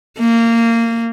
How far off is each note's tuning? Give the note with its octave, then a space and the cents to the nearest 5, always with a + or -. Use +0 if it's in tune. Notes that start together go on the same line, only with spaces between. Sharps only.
A#3 -20